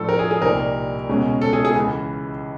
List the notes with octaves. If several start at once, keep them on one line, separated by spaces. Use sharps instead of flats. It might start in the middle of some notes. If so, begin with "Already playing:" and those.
Already playing: A2 F3 A3 D4 A4
A#4
G#4
G#4
C2 A#2 G3 A#3 D#4 A#4
C#2 B2 G#3 C#4
A4
G#4
G#4
C#2 C#3 E3